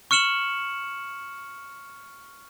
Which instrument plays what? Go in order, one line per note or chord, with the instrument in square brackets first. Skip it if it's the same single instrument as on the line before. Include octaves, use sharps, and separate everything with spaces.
[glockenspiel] C#6 F6 C#7 E7 F#7